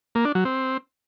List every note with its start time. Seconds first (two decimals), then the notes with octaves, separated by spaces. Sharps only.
0.15 A#3
0.25 D4
0.35 F#3
0.45 C4